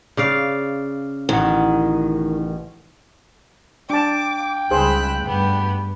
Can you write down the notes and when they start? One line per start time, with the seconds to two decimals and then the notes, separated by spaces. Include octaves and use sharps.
0.17 C#3 D5 F5
1.29 A1 D#3 F#5
3.90 D4 G5 A5 D6
4.71 C#2 G3 D#4 G#4 C5 B5 E6 F#6
5.25 G2 A3 B3 G4